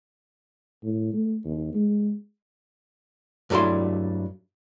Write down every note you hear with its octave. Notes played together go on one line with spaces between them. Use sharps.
A2
A3
D#2
G#3
G2 F#3 G3 A3 E4 C6